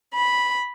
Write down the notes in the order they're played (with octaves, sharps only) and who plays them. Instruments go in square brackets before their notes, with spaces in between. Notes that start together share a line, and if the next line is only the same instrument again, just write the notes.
[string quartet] B5